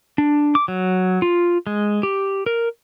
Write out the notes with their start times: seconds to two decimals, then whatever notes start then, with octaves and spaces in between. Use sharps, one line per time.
0.18 D4
0.55 D6
0.68 F#3
1.22 F4
1.67 G#3
2.03 G4
2.46 A#4